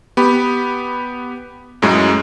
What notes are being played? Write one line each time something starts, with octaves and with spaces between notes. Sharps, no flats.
B3 G4 B5
F#2 A2 F#3 G#3